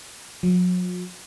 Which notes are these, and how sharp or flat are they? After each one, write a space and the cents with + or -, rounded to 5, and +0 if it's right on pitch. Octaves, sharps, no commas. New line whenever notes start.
F#3 -45